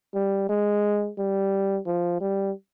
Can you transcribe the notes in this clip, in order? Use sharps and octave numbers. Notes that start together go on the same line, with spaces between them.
G3
G#3
G3
F3
G3